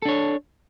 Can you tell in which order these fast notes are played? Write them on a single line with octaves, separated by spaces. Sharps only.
A4 D4 C#5